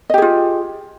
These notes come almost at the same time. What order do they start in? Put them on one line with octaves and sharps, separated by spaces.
D#5 G4 G#4 F4